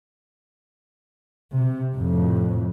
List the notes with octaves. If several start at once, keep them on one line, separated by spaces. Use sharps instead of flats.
C3
F2 A2